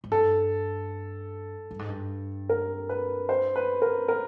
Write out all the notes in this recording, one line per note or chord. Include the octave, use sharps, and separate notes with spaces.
G#2
G2 A4
G2
G#2
G2
A#4
B4
C5
B4
A#4
A#4